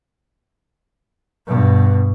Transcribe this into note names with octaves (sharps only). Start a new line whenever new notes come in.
G2 B2